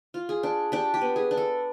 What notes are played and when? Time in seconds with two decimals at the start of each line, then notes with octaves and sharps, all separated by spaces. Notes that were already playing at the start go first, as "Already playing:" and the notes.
0.14 F4
0.29 G#4
0.43 D4
0.72 D4 G4
0.94 G4
1.01 B3
1.16 G#4
1.31 D4
1.37 A4